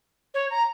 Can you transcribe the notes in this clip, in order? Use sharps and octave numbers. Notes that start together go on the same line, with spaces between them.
C#5
A#5